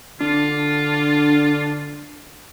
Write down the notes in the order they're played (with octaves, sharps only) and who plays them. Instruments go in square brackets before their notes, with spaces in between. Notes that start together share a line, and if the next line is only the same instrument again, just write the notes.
[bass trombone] D3 [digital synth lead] D4 [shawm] F4